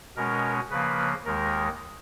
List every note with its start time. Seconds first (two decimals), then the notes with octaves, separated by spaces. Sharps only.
0.16 B2 G#3 C#4 A#4
0.70 C#3 F3 A#3 B4
1.25 D#2 D#3 G#3 A#4